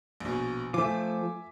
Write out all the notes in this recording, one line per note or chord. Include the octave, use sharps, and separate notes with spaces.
A#1 B2
F3 A3 E5 G#5 D6